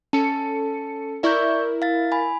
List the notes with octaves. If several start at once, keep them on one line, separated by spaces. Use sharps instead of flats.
C#4 A4 A5 C#7
E4 A#4 D5 E5 C#6 G6
F5 A6
G#5 B5